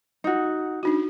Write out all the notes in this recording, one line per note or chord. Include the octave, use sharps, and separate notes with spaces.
D#4 F#4
D4 D#4 F#4